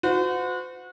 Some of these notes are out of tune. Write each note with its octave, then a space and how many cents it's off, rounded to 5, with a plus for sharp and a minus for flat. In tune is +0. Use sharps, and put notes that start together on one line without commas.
F#4 -30 C5 -40